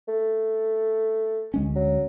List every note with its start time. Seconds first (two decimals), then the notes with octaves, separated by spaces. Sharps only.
0.08 A3
1.54 D2 G#3 C#4
1.76 F#3